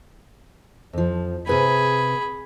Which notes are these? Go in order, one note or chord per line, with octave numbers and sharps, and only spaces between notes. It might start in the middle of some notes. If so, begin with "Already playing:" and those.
F2 F3
C3 G#4 B4 G#5 B5